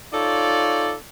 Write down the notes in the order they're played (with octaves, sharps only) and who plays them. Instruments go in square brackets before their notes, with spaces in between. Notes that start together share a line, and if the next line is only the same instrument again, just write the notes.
[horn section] D#4 F4 A4 C#5 D5